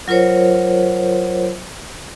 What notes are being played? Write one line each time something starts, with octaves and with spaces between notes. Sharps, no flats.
F#3 F4 A#4 C5 C#5